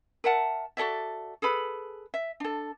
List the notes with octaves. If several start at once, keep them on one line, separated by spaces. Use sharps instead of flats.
A#4 E5 F#5 A5
F#4 A4 D5 E5
G#4 A4 B4 B5
E5
D4 A4